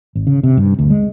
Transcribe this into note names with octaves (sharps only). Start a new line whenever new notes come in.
G#1
C#3
C3
G2
D2
G#3